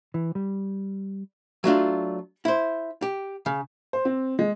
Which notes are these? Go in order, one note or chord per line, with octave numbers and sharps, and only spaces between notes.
E3
G3
F#3 A3 D4 F4
E4 C5
G4
C#3
C5
C4
G#3